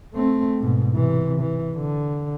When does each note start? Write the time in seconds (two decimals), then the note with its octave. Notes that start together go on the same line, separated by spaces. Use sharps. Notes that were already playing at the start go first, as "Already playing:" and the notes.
0.14 A3 C4
0.60 G#2 B2
0.94 C3 E3
1.41 E3
1.76 D3